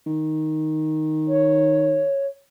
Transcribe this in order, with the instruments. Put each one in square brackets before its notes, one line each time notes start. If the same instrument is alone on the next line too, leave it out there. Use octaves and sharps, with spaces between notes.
[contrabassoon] D#3
[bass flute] C#5